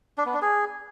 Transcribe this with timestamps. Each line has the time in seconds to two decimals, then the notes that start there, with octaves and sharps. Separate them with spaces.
0.18 D4
0.26 B3
0.34 D4
0.42 G#4